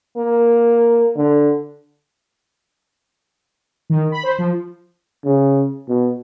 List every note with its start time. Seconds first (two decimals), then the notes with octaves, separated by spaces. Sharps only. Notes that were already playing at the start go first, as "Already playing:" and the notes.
0.16 A#3
1.16 D3
3.90 D#3
4.12 B5
4.23 C5
4.38 F3
5.24 C#3
5.88 B2